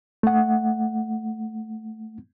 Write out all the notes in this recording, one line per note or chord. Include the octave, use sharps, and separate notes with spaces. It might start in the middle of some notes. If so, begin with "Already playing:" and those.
A3 F#5